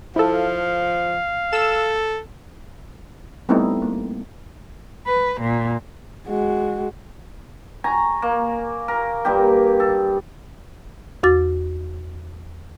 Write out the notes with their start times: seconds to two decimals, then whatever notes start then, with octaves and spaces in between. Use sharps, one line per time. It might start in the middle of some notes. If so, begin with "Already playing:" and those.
0.16 F3 E4 A4 F5
1.53 A4 E6 E7
3.49 G3 A3 B3 C4 D#4 E4
3.82 A#3
5.07 B4
5.41 A#2
6.28 G#3 F#4
7.84 G#5 A#5 C#6
8.22 A#3
8.88 A#4
9.25 G2 A#3 G4
9.80 A4
11.23 E2 F#4 D6 A6